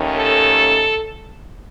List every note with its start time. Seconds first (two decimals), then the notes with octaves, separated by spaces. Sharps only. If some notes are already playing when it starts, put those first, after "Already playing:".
Already playing: D#2 D#3 A3 C#4
0.18 A4